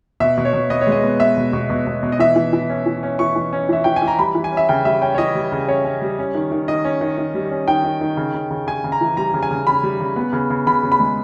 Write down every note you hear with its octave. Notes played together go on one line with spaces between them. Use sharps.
B2 E5
B2
C#5
B2
B3 D#5
C#5
G#3
D#5
B3
B3 E5
B2
B2
B2
B2
B2
D#5
E3 E5
E3
E3
C#4
E3
C#4
E3 C#6
E3
C#4
E3 E5
E3 G5
G#5
E3
A#5
G3 B5
E3
G#5
C#4
E5
C#3 G5
G3 E5
C#4 G5
C#5
E3 D#5
G3
C#3
C#4 C#5
C#4
G3
C#4
D#3
D#3
D#3 D#5
C#4
D#3
D#3
G3
C#4
D#3 G5
D#3
D#3
C#3
C#3
C#3
C#3 G#5
C#3
A#5
E3
G3 A#5
C#3
G#5
C#3
C#3 B5
G3
C#3
B3
C#3
C#3
C#3 B5
C#3
B5
G#3